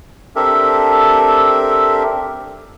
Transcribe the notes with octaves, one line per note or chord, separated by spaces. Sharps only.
C4 D4 G4 A4 A#4 E5